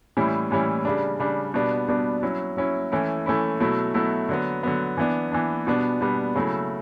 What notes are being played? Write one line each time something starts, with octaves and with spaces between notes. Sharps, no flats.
A2 E3 G3 C#4 E4
A2 E3 G3 C#4 E4
C#3 G3 D4
C#3 G3 D4
B2 G3 B3 D4
B2 G3 B3 D4
F#3 C#4 E4
F#3 C#4 E4
E3 A3 C#4 E4
E3 A3 C#4 E4
B2 F#3 A3 E4
B2 F#3 A3 E4
D3 F#3 B3
D3 F#3 B3
E3 B3 D4
E3 B3 D4
B2 G3 B3 D4
B2 G3 B3 D4
C#3 F#3 A3 E4